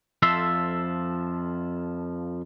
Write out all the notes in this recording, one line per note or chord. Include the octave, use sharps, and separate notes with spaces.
F2 F3 A4 E5 C6